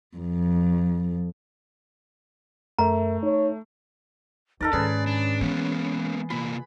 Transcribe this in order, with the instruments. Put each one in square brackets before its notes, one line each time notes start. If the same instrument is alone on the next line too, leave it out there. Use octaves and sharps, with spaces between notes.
[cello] F2
[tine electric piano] F#2 A#4 E5 [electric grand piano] A3 [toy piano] A#5
[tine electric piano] D#4 [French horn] C#5
[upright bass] E2 [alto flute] D#4 [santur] A4 A#4 D5
[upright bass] G#2 D#3 [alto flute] C#4 [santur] G#4 B4 [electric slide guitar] D5
[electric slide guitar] D4
[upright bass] E3 [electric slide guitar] G#3 A#3 B3
[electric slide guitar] C3 A#3 F4 [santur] B5